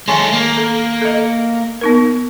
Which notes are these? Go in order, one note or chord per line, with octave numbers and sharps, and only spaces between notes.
D#3 G#3 A4 G#5 C6
A#3
A4
A4 D#5
B3 D#4 A#4